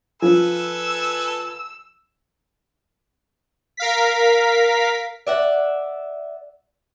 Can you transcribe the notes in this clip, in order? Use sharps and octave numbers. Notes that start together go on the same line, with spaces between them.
F3 A4 B4 G#5 E6
A#4 F5 B6
D5 E5 F#5